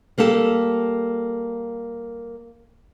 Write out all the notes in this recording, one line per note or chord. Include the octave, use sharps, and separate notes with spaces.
G3 A#3 G4 A4